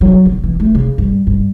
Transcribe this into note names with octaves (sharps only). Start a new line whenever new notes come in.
F#3
D3
E3
A3
C#3
G2
G2